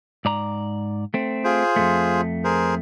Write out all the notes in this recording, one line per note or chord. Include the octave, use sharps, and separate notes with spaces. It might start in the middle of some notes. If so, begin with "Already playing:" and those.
G#2 D5 A#5
A3 C4
F4 G#4 C5
F2 G#2 A3
G#4 A#4 C5